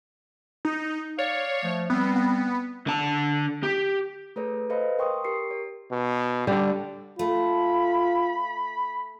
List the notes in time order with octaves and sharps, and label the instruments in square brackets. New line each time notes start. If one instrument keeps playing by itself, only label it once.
[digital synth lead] D#4
[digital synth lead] C#5 [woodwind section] D5 F5
[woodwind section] F3 A3
[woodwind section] G3 C4 [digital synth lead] B3
[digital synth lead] B3
[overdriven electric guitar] D3 A5
G4
[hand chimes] A3 G#4 A4 B4 C#5
A4 B4 C5 D#5 F5 B5
A#4 G5 C6 C#6 D#6
G4 A#4 C#6 C7 C#7
C#5
[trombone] B2
[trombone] D3 [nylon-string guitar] G3
[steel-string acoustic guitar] A3 [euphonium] F4 [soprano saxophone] B5